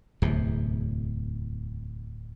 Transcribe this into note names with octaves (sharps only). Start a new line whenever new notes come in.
D1 E2 C3